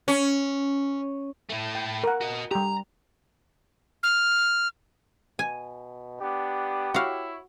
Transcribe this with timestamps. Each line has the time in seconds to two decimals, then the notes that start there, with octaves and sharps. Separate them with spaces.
0.08 C#4
1.49 A3 E4
1.75 G5
2.04 A#4 F#5
2.21 F#4 D#5
2.51 G3 G4 A#5
4.03 F6
5.39 B2 G#5
6.20 B3 D4 G4
6.94 E4 F#4 C#5 F5